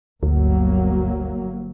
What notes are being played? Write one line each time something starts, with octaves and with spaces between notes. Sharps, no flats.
G1 D2 F#3 A#3